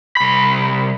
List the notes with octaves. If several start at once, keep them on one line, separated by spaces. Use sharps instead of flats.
C2 B5